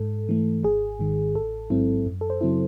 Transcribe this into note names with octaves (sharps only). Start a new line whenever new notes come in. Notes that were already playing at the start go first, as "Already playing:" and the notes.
Already playing: G#2 A4
E3 A3
G#1 G#4
G#2 D#3
A1 A4
G#2 F#3 C4 E4
F#2
A4
C5
C#3 F#3 C4 E4